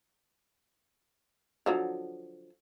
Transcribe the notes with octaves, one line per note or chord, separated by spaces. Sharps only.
D3 F3 F#3